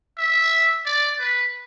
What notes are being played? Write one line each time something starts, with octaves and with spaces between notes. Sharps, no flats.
E5
D5
B4